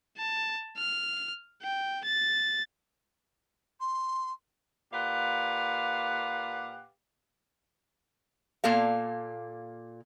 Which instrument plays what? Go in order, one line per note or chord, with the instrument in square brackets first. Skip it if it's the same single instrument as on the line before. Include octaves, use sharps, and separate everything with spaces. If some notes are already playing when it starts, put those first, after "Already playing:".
[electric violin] A5
F6
G5
A6
[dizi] C6
[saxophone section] A#2 G4 B4 F5 F#5
[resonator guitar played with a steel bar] A#2 A#3 A4 F5